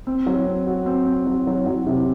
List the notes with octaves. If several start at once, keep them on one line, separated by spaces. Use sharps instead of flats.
C4
F#3
C4
F#4
C4
C4
F#3
F#3
F#3
C3